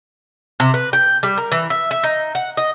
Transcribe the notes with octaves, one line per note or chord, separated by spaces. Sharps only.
C3
B4
G5
G3
A#4
E3
E5
E5
D#4
F#5
D#5